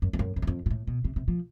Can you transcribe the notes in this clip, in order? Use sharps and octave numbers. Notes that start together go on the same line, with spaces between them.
F#2
F2
F#2
F#2
E2
F2
A#2
A2
B2
C3
C3
F3